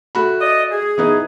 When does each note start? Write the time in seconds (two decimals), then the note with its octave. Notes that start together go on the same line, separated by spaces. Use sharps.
0.15 A3 F#4 B5
0.42 D5 D#5
0.72 G#4
0.98 E3 B3 D#4